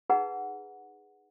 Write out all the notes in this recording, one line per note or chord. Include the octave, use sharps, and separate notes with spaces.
D#4 G#4 B4 F#5 A#5